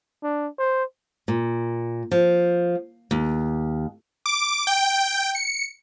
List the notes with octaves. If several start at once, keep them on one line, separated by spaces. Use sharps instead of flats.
D4
C5
A#2
F3
D#2
D6
G5
C#7